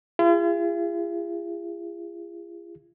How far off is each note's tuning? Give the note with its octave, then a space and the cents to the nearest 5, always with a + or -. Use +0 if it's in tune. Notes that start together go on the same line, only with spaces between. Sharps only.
F4 -45 G#4 -35